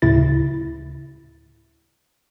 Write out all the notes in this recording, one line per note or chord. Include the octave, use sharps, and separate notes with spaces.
D2 A2 C#3 E4 A6